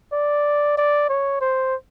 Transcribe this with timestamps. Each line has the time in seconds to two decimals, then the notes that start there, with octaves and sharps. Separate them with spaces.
0.13 D5
0.77 D5
1.09 C#5
1.41 C5